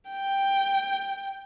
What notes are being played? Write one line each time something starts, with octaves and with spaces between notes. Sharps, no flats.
G5